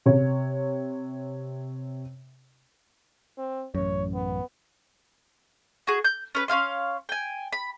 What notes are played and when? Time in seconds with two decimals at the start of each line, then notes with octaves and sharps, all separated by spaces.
0.06 C3 C#5
3.37 C4
3.75 A1 F#2 C#5
4.14 B3
5.87 F#4 G#4
6.04 G6
6.35 C#4 B4
6.48 C#4 D#4 F5 C6
7.09 G5 G#5
7.53 B5